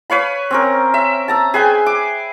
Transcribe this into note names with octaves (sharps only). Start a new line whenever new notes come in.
B4 C#5 F5 B5
C4 C#4 A#4
E5
A5 A#5 E6
G#4 B4 G5 G#5
D6